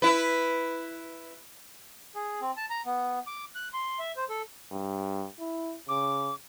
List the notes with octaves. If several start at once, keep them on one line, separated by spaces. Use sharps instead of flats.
E4 B4
G#4
C4
A5
A#5
B3
D6
F#6
C6
E5
C5
A4
G2
E4
C#3 D6